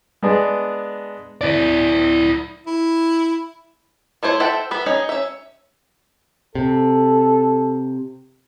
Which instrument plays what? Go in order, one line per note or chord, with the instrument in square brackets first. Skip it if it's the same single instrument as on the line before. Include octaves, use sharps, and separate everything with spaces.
[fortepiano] G#3 B3 D4 G#4
[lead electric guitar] E4 D5
[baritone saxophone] E4
[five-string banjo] A3 E4 C5 C#5
A4 C5 E5 F#5 G5
B3 E5 B5
C#4 D#4 G#4
C#4 E5
[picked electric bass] C3 [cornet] A4